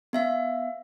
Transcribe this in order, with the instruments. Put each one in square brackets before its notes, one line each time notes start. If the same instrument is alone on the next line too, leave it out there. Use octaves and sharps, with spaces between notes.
[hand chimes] B3 E5 F5